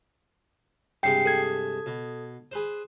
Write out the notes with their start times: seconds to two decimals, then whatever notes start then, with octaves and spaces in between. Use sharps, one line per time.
1.03 G2 C3 G#3 G5 C7
1.25 A4 G#6
1.86 B2
2.52 G#4 B4 C5